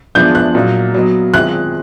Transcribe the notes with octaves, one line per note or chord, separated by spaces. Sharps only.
F3 G#3 B3 D4 G6
F#6
A#2 F#3 A#3 D#4
F#3 B3 D#4
D#3 G#3 C4 F4 F#6